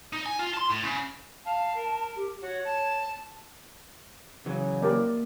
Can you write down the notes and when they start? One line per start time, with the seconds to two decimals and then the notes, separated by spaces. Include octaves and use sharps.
0.13 D#4
0.26 G#5
0.39 F4
0.54 A5 C6
0.70 A2
0.84 C#3
1.45 F5 A5
1.75 A#4
2.15 G4
2.41 F#4 C#5
2.65 A5
4.46 C#3 E3 F#3
4.82 A#3 G4 A#4 D5